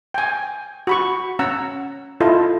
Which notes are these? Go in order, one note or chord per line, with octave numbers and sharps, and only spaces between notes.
G5 G#5
F#4 B5 C#6
C#4 F#5 A#5 E6
E4 F4 A4 D#5